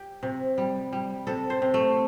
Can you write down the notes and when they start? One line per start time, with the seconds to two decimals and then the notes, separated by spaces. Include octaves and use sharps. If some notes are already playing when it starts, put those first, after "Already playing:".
Already playing: G4
0.23 C3
0.58 G3
0.93 G3
1.27 C3 A4
1.50 C5
1.62 C3
1.74 A3